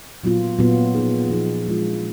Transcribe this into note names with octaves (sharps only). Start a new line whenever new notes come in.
A#2 F#3 B3 F4
A#2 F#3 B3 F4
F3 B3 D#4 G#4
F3 B3 D#4 G#4
F3 G#3 D4 F4